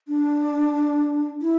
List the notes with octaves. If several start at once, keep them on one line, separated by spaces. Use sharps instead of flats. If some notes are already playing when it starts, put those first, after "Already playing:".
D4
E4